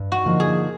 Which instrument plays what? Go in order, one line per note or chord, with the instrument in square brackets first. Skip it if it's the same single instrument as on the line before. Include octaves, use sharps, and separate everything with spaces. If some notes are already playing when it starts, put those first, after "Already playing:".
Already playing: [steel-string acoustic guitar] G2
[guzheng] F#4
[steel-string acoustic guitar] D3 F3 A#3 D#4
[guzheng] G#4